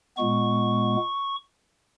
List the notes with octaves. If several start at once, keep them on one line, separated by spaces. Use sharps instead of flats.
A#2 G#3 B3 C#6